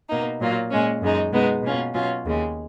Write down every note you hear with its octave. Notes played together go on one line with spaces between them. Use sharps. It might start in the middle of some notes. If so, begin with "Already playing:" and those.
B2 A#3 D#4
A#2 F#3 A#3 F4
A#2 G#3 C#4
F#2 C#3 G#3 D#4
B2 G#3 B3 D#4
B2 A#3 C#4 F4
B2 F#3 C#4 F4
D#2 C#3 G#3